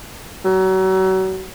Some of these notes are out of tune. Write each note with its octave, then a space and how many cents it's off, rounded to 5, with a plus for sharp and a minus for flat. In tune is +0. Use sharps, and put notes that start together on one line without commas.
F#3 +35